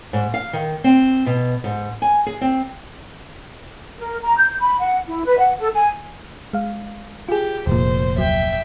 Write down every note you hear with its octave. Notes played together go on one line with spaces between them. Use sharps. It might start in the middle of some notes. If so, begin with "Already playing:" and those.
G#2
F5
D#3
C4
B2
G#2
G#5
G#4
C4
A#4
A#5
G6
B5
F#5
E4
B4
F#5
A4
G#5
G#3 F5
F4 G4 G#4
F1 A#2 C5
D2 F#3 E5 G5